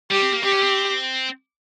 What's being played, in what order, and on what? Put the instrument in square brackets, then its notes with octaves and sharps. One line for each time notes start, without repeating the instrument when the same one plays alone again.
[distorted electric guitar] G3 [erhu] G4
[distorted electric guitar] C4
A#3
[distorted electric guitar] C4 [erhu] G4
[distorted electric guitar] C#4
C4